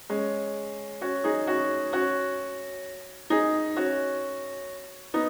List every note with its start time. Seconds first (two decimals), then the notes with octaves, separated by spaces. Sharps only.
0.10 G#3 C#4
1.01 C#4 F#4
1.24 D#4 G#4
1.47 C#4 F#4
1.93 C#4 F#4
3.30 D#4 G#4
3.76 C#4 F#4
5.14 B3 D#4